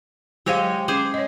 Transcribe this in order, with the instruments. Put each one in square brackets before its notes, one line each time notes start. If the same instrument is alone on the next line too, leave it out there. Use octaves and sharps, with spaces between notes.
[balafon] F#3 C5 F5 [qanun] G#3 G4 C#5
[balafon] C#4 D6 [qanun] G#4 C5
[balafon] C#5 D#5